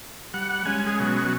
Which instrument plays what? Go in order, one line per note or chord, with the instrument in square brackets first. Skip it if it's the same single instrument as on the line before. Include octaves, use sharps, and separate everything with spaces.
[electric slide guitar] G3 [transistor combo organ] F#5
[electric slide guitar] G#3 C#4 [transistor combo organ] G#5
[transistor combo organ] G#4
B2 F#3